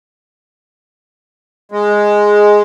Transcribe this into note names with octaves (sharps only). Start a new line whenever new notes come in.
G#3